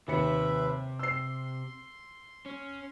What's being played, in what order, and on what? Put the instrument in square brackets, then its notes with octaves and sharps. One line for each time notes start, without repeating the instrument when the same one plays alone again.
[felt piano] D#2 C#7 [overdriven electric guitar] C3 [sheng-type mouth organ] B4 E5 B5
[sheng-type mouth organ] C6 [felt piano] E6 C7
[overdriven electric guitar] C#4